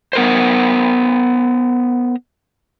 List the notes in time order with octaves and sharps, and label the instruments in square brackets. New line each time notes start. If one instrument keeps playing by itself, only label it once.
[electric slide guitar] B3 A#4 C5